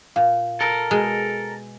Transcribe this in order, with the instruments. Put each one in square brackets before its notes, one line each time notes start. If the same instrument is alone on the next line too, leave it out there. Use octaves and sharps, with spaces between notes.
[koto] A#2 [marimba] F5
[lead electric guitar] A4 A#4
[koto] B2 G#3